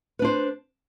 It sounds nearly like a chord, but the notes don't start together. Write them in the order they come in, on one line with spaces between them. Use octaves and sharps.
B4 D4 C5